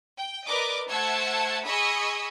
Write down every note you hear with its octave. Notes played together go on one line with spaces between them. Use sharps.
G5
A#4 B4 D5 D#5 D6
A3 C5 F#5 A5 E6 G#6
G#4 D#5 B5 C#6 D#6 E6